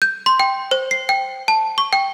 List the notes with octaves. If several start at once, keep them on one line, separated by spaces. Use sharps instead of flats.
G6
C6
G5
C5
C7
G5
A5
C#6
G5